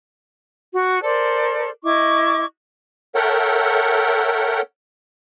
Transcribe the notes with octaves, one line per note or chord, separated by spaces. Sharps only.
F#4
A4 A#4 C5 D5
E4 D#5 C#6 D6
A4 A#4 C#5 E5 F#5 G5